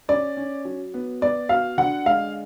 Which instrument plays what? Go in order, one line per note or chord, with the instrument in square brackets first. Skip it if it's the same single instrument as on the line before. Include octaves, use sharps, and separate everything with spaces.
[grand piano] C#4 [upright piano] D5
[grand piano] C#4
F#3
B3
[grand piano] B3 [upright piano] D5
[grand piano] F#4 [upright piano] F5
[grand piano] D3 [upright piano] F#5
[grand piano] G#3 [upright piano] F5